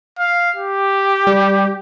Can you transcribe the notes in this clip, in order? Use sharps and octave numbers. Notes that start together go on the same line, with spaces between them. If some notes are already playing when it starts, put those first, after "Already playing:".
F5
G4
G3